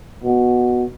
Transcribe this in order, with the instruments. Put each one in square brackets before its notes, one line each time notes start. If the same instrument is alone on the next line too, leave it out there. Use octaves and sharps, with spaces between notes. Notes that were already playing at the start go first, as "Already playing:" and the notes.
[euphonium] B2